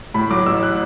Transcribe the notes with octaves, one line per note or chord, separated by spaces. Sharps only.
A2 B5
F#3 D6
A1 E6
F#6